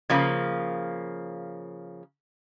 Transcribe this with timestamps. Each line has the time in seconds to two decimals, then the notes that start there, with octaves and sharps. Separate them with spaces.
0.10 C#3 F3 A#3